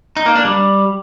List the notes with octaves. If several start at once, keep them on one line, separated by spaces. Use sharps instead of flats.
D#4
A#3
D4
G3